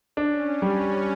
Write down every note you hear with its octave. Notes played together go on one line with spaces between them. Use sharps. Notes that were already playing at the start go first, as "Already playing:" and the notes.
C#4 D4
G3